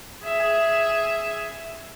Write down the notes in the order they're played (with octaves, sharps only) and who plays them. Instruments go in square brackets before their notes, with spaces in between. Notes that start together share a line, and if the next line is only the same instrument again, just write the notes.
[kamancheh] G#4 E5